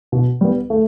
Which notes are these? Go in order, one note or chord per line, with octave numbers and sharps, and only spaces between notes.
B2
G3 B3
A3